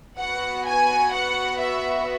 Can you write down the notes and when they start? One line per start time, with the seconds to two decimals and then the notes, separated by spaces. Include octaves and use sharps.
0.19 B3 F#4 F#5
0.66 G#5
1.13 F#5
1.60 E5